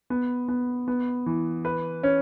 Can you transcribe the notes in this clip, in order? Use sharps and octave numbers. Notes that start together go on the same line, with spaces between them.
B3
B3
B3
E3
B4
C#4